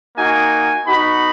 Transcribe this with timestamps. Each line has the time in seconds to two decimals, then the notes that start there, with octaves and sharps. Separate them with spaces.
0.16 A#3 D#4 F#4 G#5
0.84 B3 D#4 F#4 B5